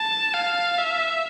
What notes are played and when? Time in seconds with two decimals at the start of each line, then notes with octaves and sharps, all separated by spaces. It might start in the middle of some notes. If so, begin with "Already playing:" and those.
Already playing: A5
0.34 F5
0.78 E5